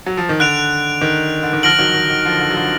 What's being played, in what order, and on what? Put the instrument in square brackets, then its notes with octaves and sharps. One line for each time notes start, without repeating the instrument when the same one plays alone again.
[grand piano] F#3
F3
D#3
[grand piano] D3 [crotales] F#6 D7 F7
[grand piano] D#3
D3
D#3
[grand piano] D3 F3 [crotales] F6 A#6 D7 F#7
[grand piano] D#3 F#3
D#3
D#3
D3 F3
D3
F#3
D3 F3